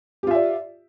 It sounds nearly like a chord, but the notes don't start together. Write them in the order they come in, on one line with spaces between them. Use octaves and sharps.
G4 F4 E5 D5